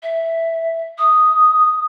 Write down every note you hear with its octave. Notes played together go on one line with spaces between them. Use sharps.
E5
D#6